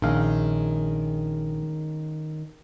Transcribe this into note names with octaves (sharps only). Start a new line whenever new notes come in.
A#1 D#3 G#3 C#4 F5